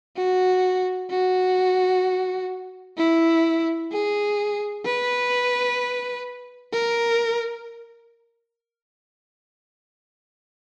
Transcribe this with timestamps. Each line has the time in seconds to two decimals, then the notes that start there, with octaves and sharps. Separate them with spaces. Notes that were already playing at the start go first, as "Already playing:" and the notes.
0.17 F#4
1.11 F#4
2.98 E4
3.92 G#4
4.85 B4
6.73 A#4